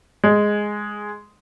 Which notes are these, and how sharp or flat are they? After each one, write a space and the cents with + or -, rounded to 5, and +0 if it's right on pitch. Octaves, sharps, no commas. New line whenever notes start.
G#3 +0